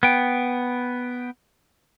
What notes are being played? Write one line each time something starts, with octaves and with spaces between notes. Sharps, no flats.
B3 G5